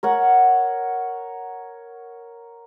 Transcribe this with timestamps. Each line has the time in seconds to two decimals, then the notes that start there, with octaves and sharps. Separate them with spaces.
0.03 A#4 C#5 F#5